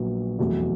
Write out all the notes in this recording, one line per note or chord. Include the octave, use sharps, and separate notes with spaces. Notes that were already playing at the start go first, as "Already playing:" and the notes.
Already playing: A#1 A#2 F#3 B3
F1 E2 B2 F#3 A3